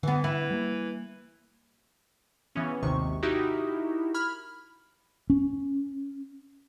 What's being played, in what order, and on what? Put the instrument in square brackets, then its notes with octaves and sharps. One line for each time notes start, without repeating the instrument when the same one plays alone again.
[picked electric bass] D3 [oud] E3 B3
[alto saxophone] E3 [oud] E4
[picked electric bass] G3 A#3
[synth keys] C#3 E3 B3 C#4
G#1 D#2 C3 D#3 C#6
D#4 E4 F#4 G4 A#4 E5
B5 F6 G#6
[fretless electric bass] C#4